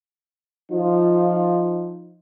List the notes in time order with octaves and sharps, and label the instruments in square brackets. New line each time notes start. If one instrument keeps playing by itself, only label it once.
[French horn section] F3 D#4 F4